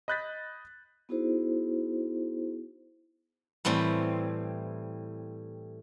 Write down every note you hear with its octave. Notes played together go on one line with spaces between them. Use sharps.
D#5 B5 F#6 G6 A6 B6
B3 D#4 E4 F#4 G#4 C5
A2 E3 G3 C4